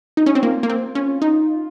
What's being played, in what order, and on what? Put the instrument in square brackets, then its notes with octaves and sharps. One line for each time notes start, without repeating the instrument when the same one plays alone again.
[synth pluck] D#4
C#4
C4
[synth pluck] A#3 [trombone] F4
[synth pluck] A#3
C4
C#4
D#4